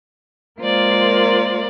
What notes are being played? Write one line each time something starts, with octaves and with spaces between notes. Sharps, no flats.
G#3 A#3 F4 A#4 C5 D5